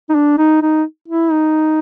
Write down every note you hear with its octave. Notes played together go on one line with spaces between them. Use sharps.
D#4
D4
D#4
D#4
E4
D#4